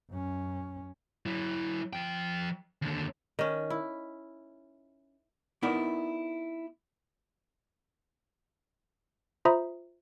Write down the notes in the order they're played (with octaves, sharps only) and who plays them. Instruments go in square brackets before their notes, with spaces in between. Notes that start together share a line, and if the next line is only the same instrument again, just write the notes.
[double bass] F#2 C#4
[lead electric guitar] F#3 E4
F3 G5
D#2 D3
[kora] D#3 C#4
E4
[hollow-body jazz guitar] B3 D#4 E4 A#4 D5 E5
[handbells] F4 C5 E5 A#5 B5 D#6